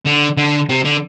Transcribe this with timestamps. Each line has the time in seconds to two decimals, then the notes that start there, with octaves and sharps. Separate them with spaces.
0.06 D3
0.37 D3
0.69 C3
0.84 D3